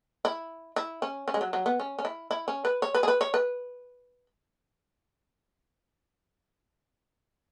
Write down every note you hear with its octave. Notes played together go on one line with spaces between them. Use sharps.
E4
E4
C#4
C#4
G#3
F#3
F#3
B3
C#4
C#4
E4
E4
C#4
B4
C#5
B4
G#4
B4
C#5
B4